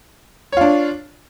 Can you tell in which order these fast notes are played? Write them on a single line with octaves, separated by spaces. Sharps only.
C#5 F4 D4